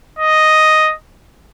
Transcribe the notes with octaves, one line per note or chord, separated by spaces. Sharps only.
D#5